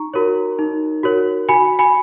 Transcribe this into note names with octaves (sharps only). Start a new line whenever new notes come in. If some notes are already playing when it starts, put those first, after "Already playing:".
Already playing: D#4 A#5 C#6
F#4 A#4 C#5
D#4
F#4 A#4 C#5
F#4 G#5 B5
G#5 B5